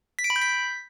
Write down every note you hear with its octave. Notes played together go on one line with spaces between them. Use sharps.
B6
D7
B5
G6
B6